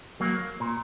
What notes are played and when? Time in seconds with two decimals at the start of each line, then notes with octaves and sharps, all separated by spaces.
0.20 F#3 A#3
0.60 A#2